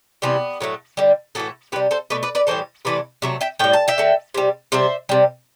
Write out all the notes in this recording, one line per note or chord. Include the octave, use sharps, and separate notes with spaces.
C3 E3 G3 B3
A2 F#3 A3
D3 G3
A2 E3 A3 F#4 A4
C3 G3 G4 B4
A4 C5
B2 A3 B4 D5
B4 D5
B4 D5
A2 E3 G3 A4 C5
C3 E3 A3 B4 D5
C3 F#3 A3 E5
E5 G5
A2 G3 G5
A5
E5 G5
D3 A3
C3 G3
C3 G3 C5 E5
C3 G3